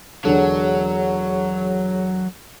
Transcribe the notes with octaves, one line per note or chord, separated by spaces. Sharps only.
E1 D3 F#3 G#4 A4 C#5 F#5